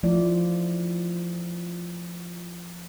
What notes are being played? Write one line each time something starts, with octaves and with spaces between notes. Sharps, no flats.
F3 A3 E4 F4 D5